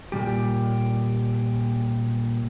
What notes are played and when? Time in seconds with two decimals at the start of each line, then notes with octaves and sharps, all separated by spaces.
0.12 A#2 G3 G4